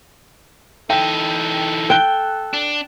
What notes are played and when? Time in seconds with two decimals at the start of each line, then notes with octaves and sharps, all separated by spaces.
0.90 E3 D#4 A4 G5
1.90 G5 F#6 G7
2.53 D4